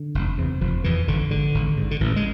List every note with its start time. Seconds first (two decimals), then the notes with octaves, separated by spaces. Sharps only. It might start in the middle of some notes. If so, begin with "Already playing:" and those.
Already playing: D3
0.15 F1
0.38 E2 C3
0.61 F1 F3
0.84 F2 C3 E3
1.08 G#1 D3
1.31 G#2 D3
1.54 G#1
1.77 G#2
1.91 D3
2.01 A1 E3
2.16 G#3